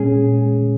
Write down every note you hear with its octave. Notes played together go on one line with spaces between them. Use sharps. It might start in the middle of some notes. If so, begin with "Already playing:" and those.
Already playing: A#2 G#3 C#4 G#4